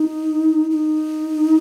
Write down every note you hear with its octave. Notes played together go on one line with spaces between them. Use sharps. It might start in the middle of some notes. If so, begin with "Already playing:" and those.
Already playing: D#4
D#4